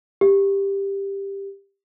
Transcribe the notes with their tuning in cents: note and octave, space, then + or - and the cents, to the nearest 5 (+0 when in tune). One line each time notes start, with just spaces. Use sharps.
G4 +10